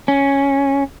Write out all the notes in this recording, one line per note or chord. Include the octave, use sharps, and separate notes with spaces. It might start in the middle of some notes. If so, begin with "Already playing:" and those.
C#4